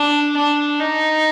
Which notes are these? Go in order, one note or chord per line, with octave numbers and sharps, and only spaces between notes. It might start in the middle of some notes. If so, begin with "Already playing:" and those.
Already playing: D4
D4
D#4